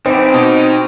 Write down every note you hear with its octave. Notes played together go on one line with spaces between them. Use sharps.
C4 D#4 E4 G4 B4 C5
B2 D#4